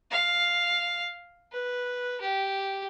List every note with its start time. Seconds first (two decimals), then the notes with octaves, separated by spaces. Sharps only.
0.11 F5
1.52 B4
2.21 G4